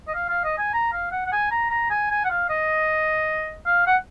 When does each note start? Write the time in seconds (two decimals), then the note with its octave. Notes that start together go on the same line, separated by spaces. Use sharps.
0.08 D#5
0.15 F5
0.29 F5
0.44 D#5
0.58 G#5
0.74 A#5
0.93 F5
1.12 F#5
1.27 F#5
1.32 G#5
1.51 A#5
1.71 A#5
1.90 G#5
2.11 G#5
2.24 F#5
2.30 F5
2.50 D#5
3.66 F5
3.87 F#5